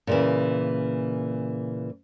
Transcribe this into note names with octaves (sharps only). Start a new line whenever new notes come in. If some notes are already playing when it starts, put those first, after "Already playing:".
A#2 C#3 E3